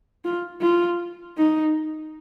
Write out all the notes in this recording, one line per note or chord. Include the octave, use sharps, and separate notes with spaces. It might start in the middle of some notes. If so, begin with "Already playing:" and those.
F4
F4
D#4